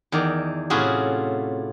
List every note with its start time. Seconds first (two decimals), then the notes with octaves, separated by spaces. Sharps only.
0.12 E2 D#3 D5
0.70 A2 C3 C#4 F4 F#4 G#4